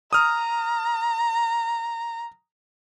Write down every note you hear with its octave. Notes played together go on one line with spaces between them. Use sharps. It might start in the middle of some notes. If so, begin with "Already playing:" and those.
A#5 D#6 F6